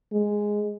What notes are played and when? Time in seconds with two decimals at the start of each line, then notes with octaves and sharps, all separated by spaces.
0.12 G#3